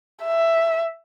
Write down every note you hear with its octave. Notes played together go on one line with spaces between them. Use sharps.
E5